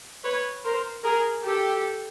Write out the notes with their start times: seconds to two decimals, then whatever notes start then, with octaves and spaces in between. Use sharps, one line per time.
0.24 B4 C#5
0.64 A#4 C5
1.03 G#4 A#4
1.43 G4 A4